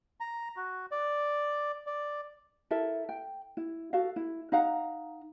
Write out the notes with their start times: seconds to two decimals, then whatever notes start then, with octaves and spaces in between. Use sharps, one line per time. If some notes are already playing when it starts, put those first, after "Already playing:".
0.20 A#5
0.57 F#4
0.91 D5
1.87 D5
2.71 E4 A4 A#4 E5
3.09 G5
3.57 E4
3.93 F#4 A4 F5
4.16 E4
4.52 D#4 F5 F#5 A#5